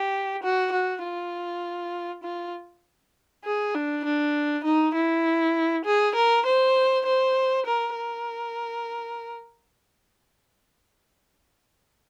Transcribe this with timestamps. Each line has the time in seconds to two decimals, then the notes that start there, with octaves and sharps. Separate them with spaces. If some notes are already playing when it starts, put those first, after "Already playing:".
Already playing: G4
0.43 F#4
0.72 F#4
1.04 F4
2.23 F4
3.44 G#4
3.75 D4
4.05 D4
4.64 D#4
4.95 E4
5.85 G#4
6.15 A#4
6.46 C5
7.06 C5
7.66 A#4
7.96 A#4